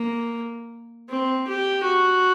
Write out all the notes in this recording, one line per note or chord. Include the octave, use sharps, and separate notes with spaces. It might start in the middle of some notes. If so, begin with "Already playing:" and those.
Already playing: A#3
C4
G4
F#4